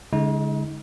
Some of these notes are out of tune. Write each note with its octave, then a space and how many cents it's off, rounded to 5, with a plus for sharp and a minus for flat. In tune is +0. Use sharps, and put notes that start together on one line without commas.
D3 -35 G#3 +0 D#4 +40